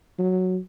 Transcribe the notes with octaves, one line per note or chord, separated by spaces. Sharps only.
F#3